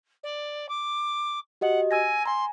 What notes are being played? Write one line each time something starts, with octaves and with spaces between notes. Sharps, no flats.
D5
D6
F#4 G4 D#5 F#5
G#5 E6 G#6 A#6
G#5 A#5 C6